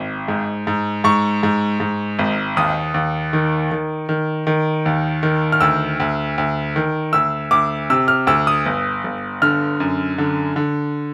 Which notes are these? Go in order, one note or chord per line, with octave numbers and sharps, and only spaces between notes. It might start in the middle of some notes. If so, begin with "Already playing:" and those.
Already playing: G#1
G#2
G#2
G#2 C#6
G#2
G#2
G#1
D#2 D#6
D#2
D#3
D#3
D#3
D#3
D#2
D#3
F6
D2 E6
D2
D2
D#3
D2 E6
D2 D6
C3 E6
F6
D2 E6
D#6
G1
G1
D3 F6
F#2
D3
D3